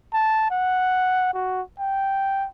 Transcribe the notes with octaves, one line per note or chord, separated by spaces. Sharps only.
A5
F#5
F#4
G5